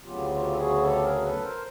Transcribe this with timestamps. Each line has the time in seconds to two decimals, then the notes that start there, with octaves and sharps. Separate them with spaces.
0.04 D2 C#3 F#3 B3 F4 G4
0.30 F4 G4
0.51 A4
0.56 F#4 G#4
0.82 G4 A4
1.02 G#4 A#4
1.22 A4 B4
1.42 A#4 C5